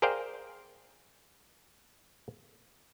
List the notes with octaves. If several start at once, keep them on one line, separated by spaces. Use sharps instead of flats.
G#4 A#4 C5 D5 F5 G5